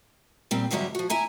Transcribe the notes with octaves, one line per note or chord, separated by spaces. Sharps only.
A#2 G3 C4
E2 G#2 D3 F#3 G3 E5
F3 F#4
E4 E5 G#5 A#5